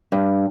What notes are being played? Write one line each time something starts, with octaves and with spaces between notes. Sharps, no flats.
G2